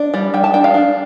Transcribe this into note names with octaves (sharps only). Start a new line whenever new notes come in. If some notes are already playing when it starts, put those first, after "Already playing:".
Already playing: D4
G3 D5
G3 G5
A5
D4 G5
F5
D4